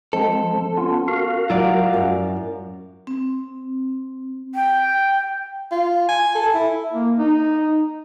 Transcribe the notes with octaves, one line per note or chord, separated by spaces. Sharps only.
F3 G#3 C4 A4
B3 C#4 F4
F#4 A#4 F5
F#3 E4 F4 D5
F#2
C4
G5
F4
G#5
A4
E4
A#3
D#4